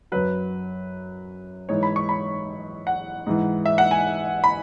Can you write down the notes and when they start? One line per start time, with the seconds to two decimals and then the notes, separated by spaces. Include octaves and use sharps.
0.12 F#2 F#3 B4
1.69 G#2 E3 C#5
1.83 B5
1.96 C#6
2.09 B5
2.87 F#5
3.27 G#2 E3
3.66 E5
3.78 F#5
3.91 G#5
4.44 B5